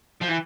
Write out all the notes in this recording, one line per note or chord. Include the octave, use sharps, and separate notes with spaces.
F3
E3